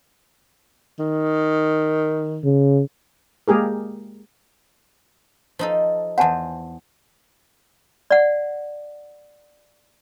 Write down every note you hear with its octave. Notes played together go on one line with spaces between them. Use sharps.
D#3
C#3
G#3 A#3 G4 G#4 A#4
F3 D#4 A4
E2 C5 F#5 G#5 A5
D5 F#5